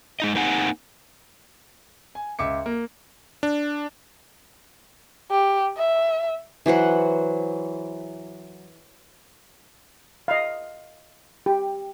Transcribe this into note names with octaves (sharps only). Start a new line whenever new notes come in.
G#3 D#4 D#5
A#3 C4 D#4 F#5 G#5
G#5
C#2 E5 D6 C#7
A#3
D4
G4
E5
E3 F#3 C5 F#5
D#5 F5
G4